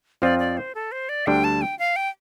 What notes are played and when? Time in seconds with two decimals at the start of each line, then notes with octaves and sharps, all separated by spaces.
0.22 F2 F3 C4 F4 D5
0.39 D5
0.57 C5
0.75 A4
0.92 C5
1.09 D5
1.26 D2 D3 G3 D4 G5
1.44 A5
1.62 G5
1.79 F5
1.96 G5